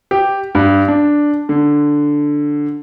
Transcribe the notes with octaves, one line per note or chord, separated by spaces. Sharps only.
G4
G2
D4
D3